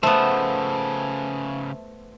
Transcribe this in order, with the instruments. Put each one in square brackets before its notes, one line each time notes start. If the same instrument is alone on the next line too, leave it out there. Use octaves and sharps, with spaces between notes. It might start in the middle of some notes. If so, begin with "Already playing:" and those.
[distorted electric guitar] C#3 F3 [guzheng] A3 B3 [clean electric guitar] C5 [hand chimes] E5 A5